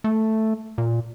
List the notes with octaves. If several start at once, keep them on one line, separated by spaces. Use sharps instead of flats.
A3
A#2